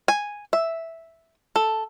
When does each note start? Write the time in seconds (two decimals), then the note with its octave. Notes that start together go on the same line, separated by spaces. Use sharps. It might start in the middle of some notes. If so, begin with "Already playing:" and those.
0.08 G#5
0.53 E5
1.56 A4